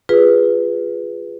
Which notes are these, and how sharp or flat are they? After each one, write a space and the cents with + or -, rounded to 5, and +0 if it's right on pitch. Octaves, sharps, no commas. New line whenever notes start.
F4 +0 G#4 -15 B4 +0